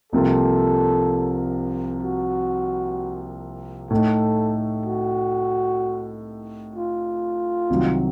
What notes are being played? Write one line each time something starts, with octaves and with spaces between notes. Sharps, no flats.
C2 C3 F3 A#3 F4 A4
F#4
A2 A3 D#4 A4
F#4
F4
C2 C3 D#3 F#3